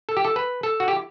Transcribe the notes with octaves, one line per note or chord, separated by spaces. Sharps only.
A4
G4
A4
B4
A4
F#4
G4